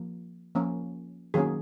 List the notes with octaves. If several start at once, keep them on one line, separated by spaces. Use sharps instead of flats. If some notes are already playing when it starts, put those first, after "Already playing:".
Already playing: F3 A#3
F3 A#3 C#4
D#3 F#3 A#3 C#4 G#4